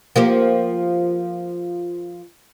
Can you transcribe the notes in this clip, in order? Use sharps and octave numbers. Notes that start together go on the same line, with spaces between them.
F3 A#3 G4